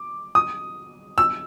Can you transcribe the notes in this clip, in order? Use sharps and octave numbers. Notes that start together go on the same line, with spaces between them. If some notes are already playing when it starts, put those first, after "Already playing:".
Already playing: D6
D#6
E6